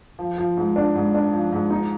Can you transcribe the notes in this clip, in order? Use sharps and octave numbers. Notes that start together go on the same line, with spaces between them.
F3
F3
G#2
D4
G#2
D4
F3
G#2
D#4